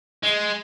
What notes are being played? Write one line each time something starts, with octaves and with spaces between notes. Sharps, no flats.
G#3